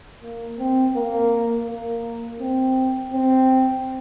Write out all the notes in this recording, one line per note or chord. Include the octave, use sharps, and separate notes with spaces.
A#3
C4
A#3
A#3
C4
C4